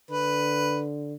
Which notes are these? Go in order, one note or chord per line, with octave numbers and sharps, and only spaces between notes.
D3 B4